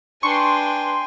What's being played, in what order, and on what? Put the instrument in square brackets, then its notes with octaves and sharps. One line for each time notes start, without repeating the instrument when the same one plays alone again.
[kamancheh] D4 B4 [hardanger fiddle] G5 G#5 [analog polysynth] C6 [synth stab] C#6